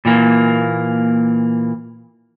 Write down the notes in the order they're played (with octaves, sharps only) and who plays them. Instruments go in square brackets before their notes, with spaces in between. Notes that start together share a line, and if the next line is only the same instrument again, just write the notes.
[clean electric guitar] A#2 E3 A#3